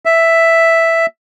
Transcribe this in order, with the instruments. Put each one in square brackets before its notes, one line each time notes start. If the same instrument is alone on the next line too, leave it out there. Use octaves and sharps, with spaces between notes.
[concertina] E5